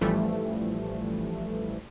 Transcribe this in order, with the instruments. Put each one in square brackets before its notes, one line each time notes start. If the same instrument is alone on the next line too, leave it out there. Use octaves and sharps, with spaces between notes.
[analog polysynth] A1 E3 F3 G3 A3